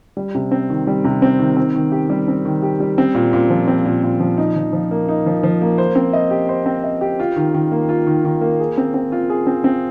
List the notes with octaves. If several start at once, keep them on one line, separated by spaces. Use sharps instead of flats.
G3
C3
C4
D#3
G3
C3
C4
D#3
C4
D#3
G4
G3
C4
D#3
G4
G3
C4
A#2
A#2
F3
C4
A#2
A#2
F3
D#4
F3
F3
A#3
D#4
F3
F3
A#3
C5
C4
D#5
G4
C5
C4
D#5
G4
F4
D#3
D#3
A#3
F4
D#3
D#3
A#3
G#4
C4
C4
F4
G#4
C4
C4